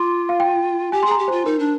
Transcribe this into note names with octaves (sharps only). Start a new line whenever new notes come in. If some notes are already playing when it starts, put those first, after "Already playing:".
Already playing: F4 C6 D6
F5
G5
G4 G#5
C6
G#4
A#5
G4
C5
F4
D#4 A#4
D4